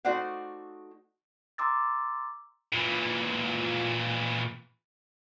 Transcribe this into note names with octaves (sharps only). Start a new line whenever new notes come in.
A3 D#4 F#4 C5 D5 F#5
A#5 C6 D6 E6 A6
A#2 E3